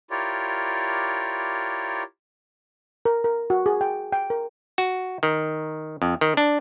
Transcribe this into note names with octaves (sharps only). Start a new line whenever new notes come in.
E4 F4 G4 A#4 C#5 D5
A#4
A#4
F#4
G#4
G5
G5
A#4
F#4
D#3
F2
D#3
D4